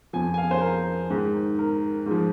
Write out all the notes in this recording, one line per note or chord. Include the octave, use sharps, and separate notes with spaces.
F2 F3 G#5
G#5
F5
C5
A#4
G#2 D#3
A#4
G#2 F3